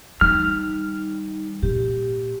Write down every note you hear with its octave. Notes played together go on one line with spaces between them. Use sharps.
D#3 G3 D#4 F6
A#2 G4